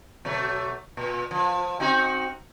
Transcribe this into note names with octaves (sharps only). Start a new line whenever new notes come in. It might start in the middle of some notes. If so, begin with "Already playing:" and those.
B2 F#3 A3
A#2
F3
C4 D#4 F#4